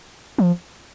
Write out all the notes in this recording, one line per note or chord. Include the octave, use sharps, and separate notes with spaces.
F3